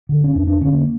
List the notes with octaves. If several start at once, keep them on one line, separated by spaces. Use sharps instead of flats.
D3
C#4
F2 D4
D4
D3 C#4
A#3